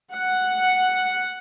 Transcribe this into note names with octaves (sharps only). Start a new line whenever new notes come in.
F#5